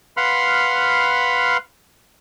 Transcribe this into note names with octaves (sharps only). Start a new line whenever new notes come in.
B4 F5 F#5 B5 C6 F6